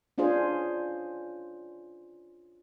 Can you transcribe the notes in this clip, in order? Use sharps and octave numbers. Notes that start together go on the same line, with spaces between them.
C#4 D4 F4 G#4 C5